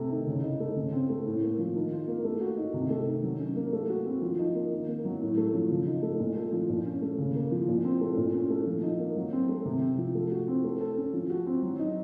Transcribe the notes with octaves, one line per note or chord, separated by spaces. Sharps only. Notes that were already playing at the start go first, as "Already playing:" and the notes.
Already playing: C3 A3
D#3
C#3
D#4
A3
C#3
C4
A3
A2
A#3
F3
D#3
F4
A#3
A3
F#4
D#4
C3
A3
D#3
F#3
C#4
A#3
A3
F#4
C4
F3
D#4
A#3
D#3
A#3
F#3
A2
A3
F3
C#3
D#4
A3
A#2
A3
F3
A#2
C#4
A3
C#3
A#3
F3
A#2
C4
A3
A#2
C#4
A3
F3
D#4
A#3
F#3
C4
A3
C3
C4
F3
A3
F#4
C4
A3
A4
C#4
F3
F#4
C4
F#3
D#4